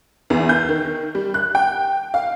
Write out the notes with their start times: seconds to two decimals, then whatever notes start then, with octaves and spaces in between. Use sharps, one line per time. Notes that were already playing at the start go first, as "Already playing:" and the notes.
0.30 E2
0.49 G6
0.69 D#3
1.15 G3
1.34 F#6
1.55 G5
2.14 F5